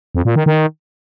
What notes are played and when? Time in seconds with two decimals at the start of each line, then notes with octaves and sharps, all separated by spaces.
0.15 F2
0.25 A#2
0.36 D#3
0.46 D#3